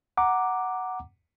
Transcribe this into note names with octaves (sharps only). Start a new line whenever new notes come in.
F#5 A#5 D6